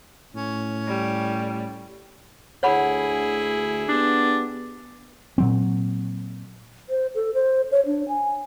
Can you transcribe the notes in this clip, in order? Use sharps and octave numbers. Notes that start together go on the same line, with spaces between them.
A2 C#4
G3
D2 E4 G#4 C#5 F#5 B5
B3 D4 G4
A#2 F#3 C4
C5
A4
C5
C#5
D4
G#5